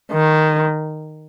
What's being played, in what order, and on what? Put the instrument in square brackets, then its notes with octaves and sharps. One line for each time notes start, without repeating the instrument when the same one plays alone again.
[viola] D#3